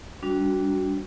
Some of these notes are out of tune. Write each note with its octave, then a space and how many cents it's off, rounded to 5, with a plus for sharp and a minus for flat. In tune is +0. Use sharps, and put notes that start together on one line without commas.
G3 +0 D4 -20 F#4 +0